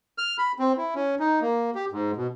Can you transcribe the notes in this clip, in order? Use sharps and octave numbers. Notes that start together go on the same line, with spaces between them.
F6
B5
C4
E4
C#4
D#4
A#3
G4
G#2
B2